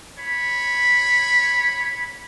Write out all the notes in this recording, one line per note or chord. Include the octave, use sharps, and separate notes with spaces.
C#5 B5